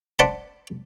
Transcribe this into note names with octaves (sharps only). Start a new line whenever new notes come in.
D4 C5 F#5 A5 B5